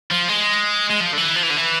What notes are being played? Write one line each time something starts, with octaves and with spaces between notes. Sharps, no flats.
F3
G#3
G#3
F3
D3
E3
F3
E3
D3
E3